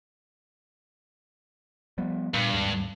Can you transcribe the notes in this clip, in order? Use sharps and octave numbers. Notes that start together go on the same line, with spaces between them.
F3 G3 B3
G2 A#2
D#2 G#2